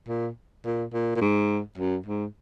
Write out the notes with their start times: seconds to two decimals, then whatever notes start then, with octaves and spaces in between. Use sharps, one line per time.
0.08 A#2
0.64 A#2
0.93 A#2
1.15 A#2
1.21 G#2
1.78 F#2
2.06 G#2